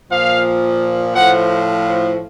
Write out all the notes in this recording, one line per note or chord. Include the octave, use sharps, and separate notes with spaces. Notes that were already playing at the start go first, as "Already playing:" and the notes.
A#2 F3 F5
A2 F3 F#5